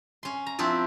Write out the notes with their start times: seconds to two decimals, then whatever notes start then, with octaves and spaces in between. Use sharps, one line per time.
0.23 C#4 C6
0.46 A#5
0.59 F3 C4 D4 E4 F4